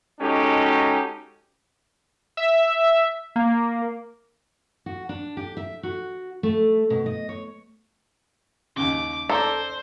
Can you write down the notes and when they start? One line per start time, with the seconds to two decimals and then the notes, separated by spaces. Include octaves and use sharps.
0.20 G#3 C#4 D#4 F#4 G4 A4
2.37 E5
3.36 A#3
4.86 F#4
5.09 D4
5.37 G4
5.57 E5
5.83 F#4
6.43 A3
6.90 B2
7.06 D#5
7.29 C#5
8.76 D#2 C#3 D6
9.29 A4 A#4 C5 D5